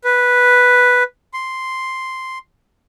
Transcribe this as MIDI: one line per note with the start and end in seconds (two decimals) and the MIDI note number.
0.04 1.03 71
1.34 2.38 84